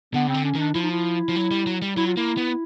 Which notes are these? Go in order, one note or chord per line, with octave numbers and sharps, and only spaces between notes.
D3 B3
C#3 C4
D3
C#4
D#3 D4
F3 E4
D#4
E4
F3
F#3
G3
F#3
G3
F#3 E4
F4
A#3 E4
B3